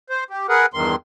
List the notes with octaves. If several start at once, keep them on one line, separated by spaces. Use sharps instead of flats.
C5
G4
G#4 A#4 B4 F#5
E2 G2 D#3 C6